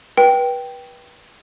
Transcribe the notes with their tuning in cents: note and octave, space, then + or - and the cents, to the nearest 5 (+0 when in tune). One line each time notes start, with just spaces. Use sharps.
B4 -25 G5 -5